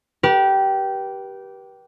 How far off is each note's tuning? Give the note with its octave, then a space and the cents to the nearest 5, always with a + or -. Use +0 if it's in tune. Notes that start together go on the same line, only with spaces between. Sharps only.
G4 -15 B4 -40